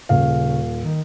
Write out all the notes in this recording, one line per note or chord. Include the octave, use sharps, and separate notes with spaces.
D#1 C#3 F5
D#3